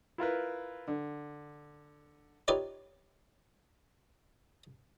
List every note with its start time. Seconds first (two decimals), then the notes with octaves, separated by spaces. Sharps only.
0.18 E4 F4 A#4 B4
0.88 D3
2.48 D#4 F4 G4 B4 C#5 D5